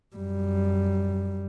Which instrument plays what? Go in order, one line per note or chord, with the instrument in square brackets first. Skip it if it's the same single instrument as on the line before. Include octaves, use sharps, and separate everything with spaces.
[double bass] F#2 G3